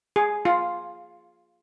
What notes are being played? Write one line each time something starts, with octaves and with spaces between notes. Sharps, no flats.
G#4
F4